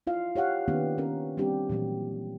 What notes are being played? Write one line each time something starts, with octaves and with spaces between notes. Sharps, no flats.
E4 F4 F5
G4 C#5 F5 F#5
D#3 A#3 B3 C#4 D4 G4
D#3 C#4 A#4
G3 C4 D4 G4
A#2 E3 F#3 G4